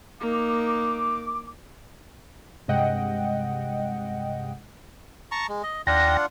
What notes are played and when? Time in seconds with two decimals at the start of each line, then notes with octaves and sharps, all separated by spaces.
0.21 A#3 D#4 D6
2.68 G2 C3 G#3 D#5 F#5 G5
5.31 A5 A#5 C#6
5.49 G#3
5.63 D#5
5.87 D#2 D4 F4 F#5 G5 A#6